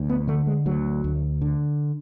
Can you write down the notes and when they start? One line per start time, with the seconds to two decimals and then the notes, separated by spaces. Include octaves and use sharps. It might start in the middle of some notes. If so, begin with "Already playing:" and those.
Already playing: D2
0.09 B3
0.28 D3 A3
0.47 G#3
0.66 D2 F#3
1.04 D2
1.41 D3